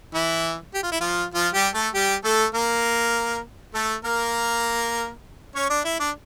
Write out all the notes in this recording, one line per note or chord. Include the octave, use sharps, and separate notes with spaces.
E3 E4
G4
F4
E4
F3 F4
F3 F4
G3 G4
A3 A4
G3 G4
A3 A4
A#3 A#4
A3 A4
A#3 A#4
C#4 C#5
D4 D5
E4 E5
D4 D5